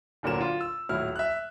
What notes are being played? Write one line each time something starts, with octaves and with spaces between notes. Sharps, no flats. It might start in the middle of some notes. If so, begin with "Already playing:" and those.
D1 A#2 D3 F#3 A#4 E7
F4
E6
D#1 A2 F#3 E4 F6
E5 F#6